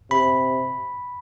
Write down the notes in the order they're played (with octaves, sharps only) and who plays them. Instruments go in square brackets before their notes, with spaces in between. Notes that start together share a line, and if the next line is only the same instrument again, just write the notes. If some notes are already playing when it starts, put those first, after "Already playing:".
[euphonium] C3 [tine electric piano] B5